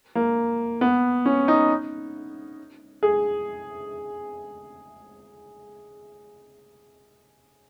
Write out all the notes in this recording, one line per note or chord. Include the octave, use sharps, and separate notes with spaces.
A#3
B3
C#4
D#4
G#4